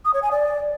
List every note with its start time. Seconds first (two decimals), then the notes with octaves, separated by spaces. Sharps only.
0.05 D#6
0.14 C#5
0.22 G#5
0.31 D5